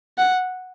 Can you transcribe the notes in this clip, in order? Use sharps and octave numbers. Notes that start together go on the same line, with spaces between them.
F#5